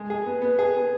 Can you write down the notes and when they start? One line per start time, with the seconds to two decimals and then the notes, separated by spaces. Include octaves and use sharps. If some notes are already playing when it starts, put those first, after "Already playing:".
Already playing: G#3
0.10 G#4
0.26 B3
0.42 B3
0.59 G#4
0.75 B3